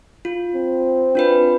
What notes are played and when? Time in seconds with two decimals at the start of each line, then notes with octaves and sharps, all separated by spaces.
0.25 F4
0.55 C4
1.15 D4 F4 B4